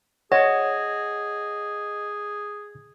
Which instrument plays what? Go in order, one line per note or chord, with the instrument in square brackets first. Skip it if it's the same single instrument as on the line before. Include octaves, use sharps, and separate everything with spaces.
[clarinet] G#4 [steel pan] C#5 [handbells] D#5 [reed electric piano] F#5